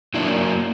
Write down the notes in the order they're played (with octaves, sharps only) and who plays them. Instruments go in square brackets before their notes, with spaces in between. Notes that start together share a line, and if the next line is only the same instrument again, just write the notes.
[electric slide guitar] F#3 A#3 D4 E4